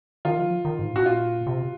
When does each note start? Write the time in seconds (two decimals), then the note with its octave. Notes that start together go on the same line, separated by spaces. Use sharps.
0.25 D#3 F4
0.38 F3
0.65 D#3
0.79 G#2
0.92 A#2 F#4
1.06 F4
1.47 C3